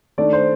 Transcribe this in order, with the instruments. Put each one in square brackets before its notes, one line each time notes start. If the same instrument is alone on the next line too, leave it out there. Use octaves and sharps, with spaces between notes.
[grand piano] D#3 A3 D4 D5
C5